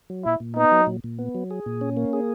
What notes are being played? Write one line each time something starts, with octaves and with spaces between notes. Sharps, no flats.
F#3
A#2 E4
A#2
B3 D#4
F#3
A#2
A#2
B3
F#3
G#4
A#2
C#4
A#3
G#4